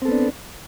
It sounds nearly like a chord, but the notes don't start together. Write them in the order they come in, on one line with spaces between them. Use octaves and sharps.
C4 A4 B3 D4